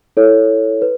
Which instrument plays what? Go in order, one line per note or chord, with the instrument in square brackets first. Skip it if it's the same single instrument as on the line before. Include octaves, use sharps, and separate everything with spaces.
[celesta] E4 A4 C#5
B4